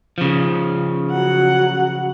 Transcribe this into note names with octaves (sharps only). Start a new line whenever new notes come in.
C#3 F3
F#3 F#5